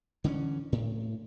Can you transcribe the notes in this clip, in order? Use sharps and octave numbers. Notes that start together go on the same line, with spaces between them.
D3 E3 C4 C#4
A2